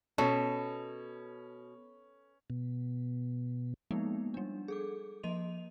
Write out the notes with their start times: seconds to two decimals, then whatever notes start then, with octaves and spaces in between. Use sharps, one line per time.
0.18 B2 C#4 A4
2.50 B2
3.91 F3 G#3 A#3 B3 D#4
4.34 G3 D4
4.68 G#4 A4 D6
5.23 F3 A#3 D#5 C6 D#7 F7